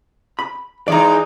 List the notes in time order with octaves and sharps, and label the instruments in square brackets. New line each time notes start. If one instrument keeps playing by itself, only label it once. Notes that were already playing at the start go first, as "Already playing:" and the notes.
[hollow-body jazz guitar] B5
[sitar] E3 G#3 D#4 [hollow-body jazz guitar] D5 A#5